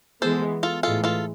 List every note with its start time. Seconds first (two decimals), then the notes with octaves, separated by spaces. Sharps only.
0.22 E3 G#3 B3 A4 C5
0.63 F4 A4
0.83 A2 E3 G#3 F4 A4
1.04 F4 A4